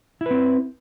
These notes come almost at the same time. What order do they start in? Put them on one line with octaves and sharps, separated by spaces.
E4 B4 C4